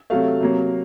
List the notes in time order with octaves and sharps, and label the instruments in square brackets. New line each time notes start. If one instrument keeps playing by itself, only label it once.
[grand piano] C3 F#3 A3 F5
C3 F#3 A#3